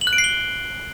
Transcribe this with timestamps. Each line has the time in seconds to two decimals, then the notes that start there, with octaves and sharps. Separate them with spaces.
0.01 F#7
0.07 F#6
0.13 D7
0.18 C7
0.24 G7